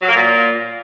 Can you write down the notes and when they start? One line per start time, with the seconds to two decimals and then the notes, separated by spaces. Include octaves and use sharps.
0.02 F#3
0.09 A#3
0.15 A#2